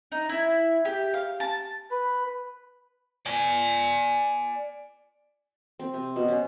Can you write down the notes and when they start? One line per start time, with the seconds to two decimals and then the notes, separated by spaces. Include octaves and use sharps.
0.12 D#4
0.29 E4
0.85 G4
1.14 F5
1.40 A5
1.91 B4
3.26 D5 G#5
5.79 C4
5.94 C3
6.16 B2
6.28 C#4